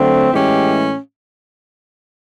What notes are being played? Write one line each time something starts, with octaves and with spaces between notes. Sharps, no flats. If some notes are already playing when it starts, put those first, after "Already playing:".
Already playing: D3 F#3 A3 C4
A2 E3 G#3 C#4 G4